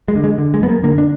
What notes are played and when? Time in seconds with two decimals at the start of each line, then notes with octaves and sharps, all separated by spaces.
0.08 G#3
0.15 D3
0.24 G#3
0.38 D3
0.54 G#3
0.61 F#2 B3
0.69 A#3
0.83 D3 A#3
0.98 D4